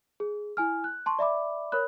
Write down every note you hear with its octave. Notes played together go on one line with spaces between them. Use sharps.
G#4
E4 G#5 F6
F#6
A5 C6 C#6
D5 E5 B5 D6
A#4 C#5 B5 F#6